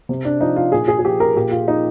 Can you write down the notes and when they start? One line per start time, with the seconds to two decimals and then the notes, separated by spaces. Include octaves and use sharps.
0.09 C3
0.25 D4
0.40 F3 D#4
0.56 F4
0.72 A#2 G#4
0.88 G#4
0.99 G#4
1.04 F3 G4
1.20 A#4
1.36 A#2 G4
1.51 F4
1.68 F3 D#4